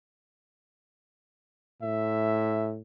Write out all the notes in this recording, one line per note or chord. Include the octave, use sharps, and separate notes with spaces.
A2 E5